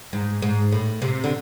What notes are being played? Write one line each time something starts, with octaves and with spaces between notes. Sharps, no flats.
G#2
G#2
A2
C3
D3